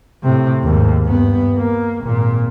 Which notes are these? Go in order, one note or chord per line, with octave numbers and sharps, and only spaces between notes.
A2 C3
D#2 G#2
G2 B3
A#3
G#1 A#2